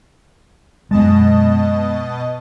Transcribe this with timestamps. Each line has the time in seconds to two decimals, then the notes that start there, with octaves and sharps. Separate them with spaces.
0.91 F#2 B2 G#3 D#5 A5